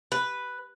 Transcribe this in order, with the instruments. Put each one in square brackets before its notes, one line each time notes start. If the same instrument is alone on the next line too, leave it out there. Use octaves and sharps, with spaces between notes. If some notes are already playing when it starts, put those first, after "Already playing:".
[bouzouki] B4